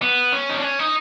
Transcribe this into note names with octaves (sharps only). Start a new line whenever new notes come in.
B3
C#4
D#4
D4
C#4
D#4